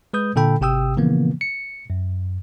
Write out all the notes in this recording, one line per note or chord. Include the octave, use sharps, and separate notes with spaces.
G#3 B4 D#6 G6
A#2 D3 A4 G5 B5
G#1 C3 G4 G5 D#6 E6
A#2 C#3 E3 F3 A#3 B3
C#7
F#2